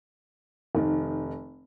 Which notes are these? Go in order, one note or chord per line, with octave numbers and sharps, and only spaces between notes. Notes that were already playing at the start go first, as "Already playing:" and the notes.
F1 D#3